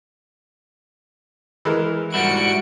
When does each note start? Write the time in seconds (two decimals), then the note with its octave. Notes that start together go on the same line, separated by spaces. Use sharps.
1.65 E3 G#3 A#4
2.14 G#2 G3 E4 F#4 C#7 D7